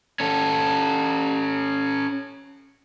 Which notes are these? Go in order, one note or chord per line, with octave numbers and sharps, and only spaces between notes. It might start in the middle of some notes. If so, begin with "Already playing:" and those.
C#4 A4